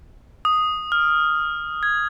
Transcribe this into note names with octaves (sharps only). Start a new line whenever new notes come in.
D#6
F6
G#6